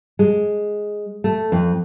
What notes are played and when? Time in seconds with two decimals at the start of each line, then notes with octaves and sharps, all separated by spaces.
0.19 G#3
1.24 A3
1.52 F2